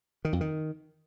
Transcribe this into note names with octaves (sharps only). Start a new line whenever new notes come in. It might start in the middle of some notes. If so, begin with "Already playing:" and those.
D#3
F2
D#3